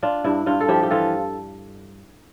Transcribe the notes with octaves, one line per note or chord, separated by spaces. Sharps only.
D4 F4
G2 E4
G2 F4
A4
F3 E4 G4
G4
E3 F4 A4